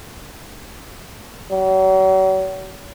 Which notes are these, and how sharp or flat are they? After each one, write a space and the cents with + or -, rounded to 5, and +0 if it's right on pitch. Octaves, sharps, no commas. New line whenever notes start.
F#3 +40